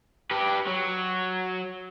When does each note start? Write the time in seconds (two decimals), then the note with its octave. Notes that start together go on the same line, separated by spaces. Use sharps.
0.31 G4 B4
0.67 F#3